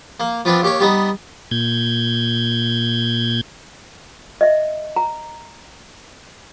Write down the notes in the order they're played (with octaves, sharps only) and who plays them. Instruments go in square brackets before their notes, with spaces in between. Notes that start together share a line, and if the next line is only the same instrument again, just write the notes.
[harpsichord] A#3
F3 B3 C4 D4
D#2 G4 C#5
G3 B3 D#4
[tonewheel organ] A#2 G6 G#6
[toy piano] D#5 E5
A#5